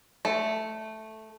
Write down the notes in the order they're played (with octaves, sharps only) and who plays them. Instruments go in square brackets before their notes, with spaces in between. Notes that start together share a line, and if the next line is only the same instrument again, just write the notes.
[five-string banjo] A3